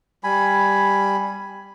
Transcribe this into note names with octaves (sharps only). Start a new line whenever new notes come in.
G3 G#5 B5